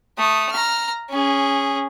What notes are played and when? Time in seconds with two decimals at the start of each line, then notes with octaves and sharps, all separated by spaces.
0.18 A3 D#6
0.51 A#5 F6
1.10 C#4 G#4